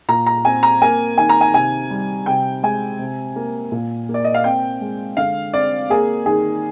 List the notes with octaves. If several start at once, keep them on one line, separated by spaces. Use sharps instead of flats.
A#2 A#5
A#5
C4 G#5
A#5
A#3 G#5
D#3 G#5
A#5
G#5
C3 G#5
G3
C3 G5
G#3 G#5
C3
A#3
A#2
A#3
D5
D#5
F5
C4 G5
G#3
D3 F5
C4 D5
A#3 G#4
D#3 G#4